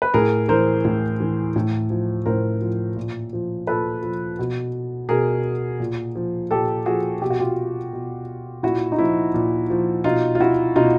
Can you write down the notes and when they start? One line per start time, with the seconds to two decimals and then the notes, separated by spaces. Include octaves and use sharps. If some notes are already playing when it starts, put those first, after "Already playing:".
0.02 B4
0.14 A2 G#4 A#4
0.48 E3 A#4 C5
0.85 A2
1.20 E3
1.56 A2
1.90 F3
2.26 A2 A#4 C5
2.61 F3
2.96 A#2
3.33 F3
3.67 A#2 A4 B4
4.03 F3
4.39 B2
5.09 B2 G#4 A#4
5.80 A#2
6.15 F3
6.51 A#2 G4 A4
6.86 F3 F#4 G#4
7.22 B2 G4
7.30 F#4
7.40 F4 G4
7.93 B2
8.63 A#2 E4 F#4
8.92 D#4
8.98 F3 E4
9.34 A#2
9.70 F3
10.04 B2 D#4 F4
10.35 F4
10.40 E4 F#4
10.76 B2 D#4 F4